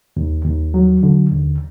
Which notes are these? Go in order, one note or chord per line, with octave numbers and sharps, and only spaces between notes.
D#2
D#2
F#3
D3
D#2